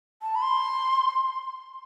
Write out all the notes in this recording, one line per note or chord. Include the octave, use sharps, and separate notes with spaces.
A5
B5
C6